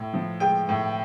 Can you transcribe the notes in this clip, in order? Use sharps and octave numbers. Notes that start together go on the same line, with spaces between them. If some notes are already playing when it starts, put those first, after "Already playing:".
Already playing: A2
F3
G#3 G5
A2